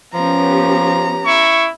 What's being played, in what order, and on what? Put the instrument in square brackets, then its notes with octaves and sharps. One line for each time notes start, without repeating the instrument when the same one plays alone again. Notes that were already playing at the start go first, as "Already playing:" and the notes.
[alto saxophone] F3 [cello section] B3 C#4 G4 [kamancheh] A#5
[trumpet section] E4 C#6